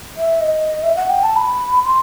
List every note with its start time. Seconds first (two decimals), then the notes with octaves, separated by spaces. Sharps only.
0.17 E5
0.41 D#5
0.83 E5
0.96 F#5
1.10 G5
1.23 A5
1.36 B5
1.84 C6